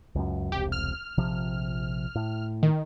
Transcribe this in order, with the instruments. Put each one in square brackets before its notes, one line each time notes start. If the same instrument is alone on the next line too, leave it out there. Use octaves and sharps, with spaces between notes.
[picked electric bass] C#2 F#2
[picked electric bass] E1 C2 [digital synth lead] G4
[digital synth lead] F6
[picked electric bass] A#1 C3 F3
A2
[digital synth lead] D#3